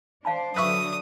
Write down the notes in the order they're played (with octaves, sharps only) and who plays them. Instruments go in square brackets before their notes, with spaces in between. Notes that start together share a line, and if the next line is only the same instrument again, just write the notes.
[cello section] D4 C5 [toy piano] F5 A5 B5
[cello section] D3 F#3 [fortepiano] B4 E5 C#6 [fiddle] D#6